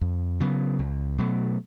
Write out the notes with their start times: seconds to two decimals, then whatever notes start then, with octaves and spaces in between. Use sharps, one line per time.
0.01 F2
0.40 C#3 F#3 B3
0.79 C#2
1.18 B2 F#3 A3